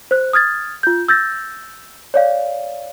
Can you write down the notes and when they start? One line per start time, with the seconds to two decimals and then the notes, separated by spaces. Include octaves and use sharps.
0.11 C5 F#6
0.33 D#6 F6 G#6 A6
0.83 F4 G6
1.08 E6 G6 A6 A#6
2.14 C#5 D5 F5